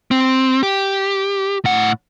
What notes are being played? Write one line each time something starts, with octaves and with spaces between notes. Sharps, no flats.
C4
G4
A2 F#5